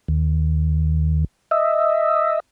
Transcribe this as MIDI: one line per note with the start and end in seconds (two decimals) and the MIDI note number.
0.08 1.24 39
1.51 2.40 75
1.51 2.40 76